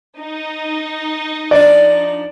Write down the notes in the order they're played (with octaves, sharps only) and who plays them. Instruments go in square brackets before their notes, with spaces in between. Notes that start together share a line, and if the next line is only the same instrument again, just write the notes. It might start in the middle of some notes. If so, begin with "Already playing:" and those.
[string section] D#4
[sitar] F3 D4 [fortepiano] D5